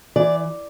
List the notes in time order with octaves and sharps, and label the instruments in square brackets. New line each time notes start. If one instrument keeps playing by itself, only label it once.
[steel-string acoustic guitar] E3 D5